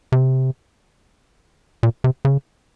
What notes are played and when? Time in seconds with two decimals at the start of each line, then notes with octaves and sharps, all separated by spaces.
0.12 C3
1.83 A#2
2.04 C3
2.25 C#3